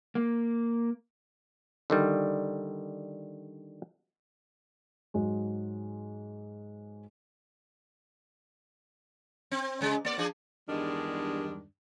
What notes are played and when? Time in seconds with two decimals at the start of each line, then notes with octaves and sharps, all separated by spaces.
0.15 A#3
1.90 D3 D#3 G3
5.14 G#2 F#3 G#3
9.51 C4
9.81 C#3 G#3
10.05 A#3 D5
10.18 F3 D4 G#4
10.69 E2 G2 D#3 G3 G#3 D4